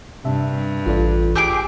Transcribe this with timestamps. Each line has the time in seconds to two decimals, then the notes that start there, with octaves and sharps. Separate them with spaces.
0.25 G2 C3 E5 A5
0.86 A1 F4 A4 D5
1.35 G4 G#4 D6 E6